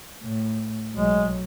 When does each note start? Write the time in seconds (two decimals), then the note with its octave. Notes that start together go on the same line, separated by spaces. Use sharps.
0.22 A2
0.94 B1 F#3 G#3